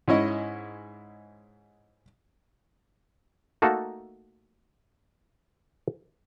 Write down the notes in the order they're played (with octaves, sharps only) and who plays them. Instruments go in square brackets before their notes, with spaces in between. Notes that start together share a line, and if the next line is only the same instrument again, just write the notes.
[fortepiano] G#2 C#4 E4 D#5
[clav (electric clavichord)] A3 A#3 D#4 F#4 A4